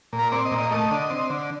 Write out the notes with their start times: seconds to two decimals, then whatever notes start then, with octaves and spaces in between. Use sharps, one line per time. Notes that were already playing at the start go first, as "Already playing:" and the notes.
0.13 A#2
0.19 A#4
0.32 C4 D5
0.45 D#5
0.51 A#2
0.58 D#5
0.71 A3 D#5
0.91 D3
1.10 C4
1.30 D3